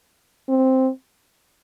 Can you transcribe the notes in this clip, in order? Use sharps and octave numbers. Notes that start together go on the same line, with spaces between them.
C4